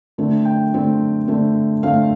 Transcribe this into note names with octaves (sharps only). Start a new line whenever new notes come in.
D3 A3 C4
G5
D3 A3 C4
D3 A3 C4
D3 A3 C4 F5